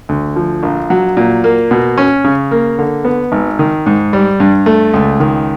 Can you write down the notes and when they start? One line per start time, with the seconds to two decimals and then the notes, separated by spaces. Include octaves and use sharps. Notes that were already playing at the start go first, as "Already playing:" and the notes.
0.09 D2
0.36 F3
0.63 A#1
0.90 F#3
1.17 A#2
1.44 A#3
1.71 B2
1.98 C#4
2.25 C#3
2.51 A#3
2.79 D3
3.05 B3
3.32 G#1
3.59 D#3
3.86 G#2
4.13 G3
4.40 G2
4.66 A3
4.93 C#2
5.20 D#3